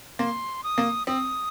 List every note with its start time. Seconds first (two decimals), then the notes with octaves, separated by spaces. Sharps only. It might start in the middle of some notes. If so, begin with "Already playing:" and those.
0.19 A#3 C6
0.64 D#6
0.78 A#3
1.07 C4 D#6